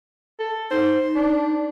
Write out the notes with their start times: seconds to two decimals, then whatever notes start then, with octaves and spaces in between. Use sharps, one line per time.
0.39 A4
0.71 D#4 C5
1.15 D4